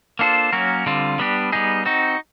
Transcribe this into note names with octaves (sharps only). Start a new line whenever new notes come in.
A#3 D4 F4 A4 C5
F#3 A#3 C#4 F#4 A#4
D3 G3 C4 F4
G3 B3 D4 G4
G3 B3 D#4 G#4
C4 D#4 F#4